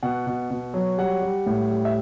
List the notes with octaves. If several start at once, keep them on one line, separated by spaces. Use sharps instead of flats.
B2 F#5
B2
B2
F#3
G3 F#5
G3
A2
G3
E5